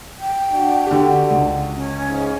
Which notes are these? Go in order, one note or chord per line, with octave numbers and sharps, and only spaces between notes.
G5
D4 F#4
D3 G4
C#2
C#4
G#2